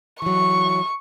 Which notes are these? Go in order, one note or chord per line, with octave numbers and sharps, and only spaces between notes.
E3 F#3 C#6